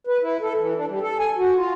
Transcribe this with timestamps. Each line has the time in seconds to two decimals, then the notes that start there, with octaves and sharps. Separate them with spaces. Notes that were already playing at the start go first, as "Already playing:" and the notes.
0.07 B4
0.22 E4
0.41 A4
0.58 E3
0.75 D4
0.88 G3
1.02 A4
1.19 G#5
1.37 F#4
1.56 F4